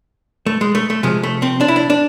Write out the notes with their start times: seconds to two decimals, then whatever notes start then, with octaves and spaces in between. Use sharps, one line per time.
0.46 A3
0.61 G#3
0.75 A3
0.90 A3
1.03 C3 F3 G#3
1.23 A3
1.42 C4
1.61 D4
1.68 E4
1.76 D4
1.90 D4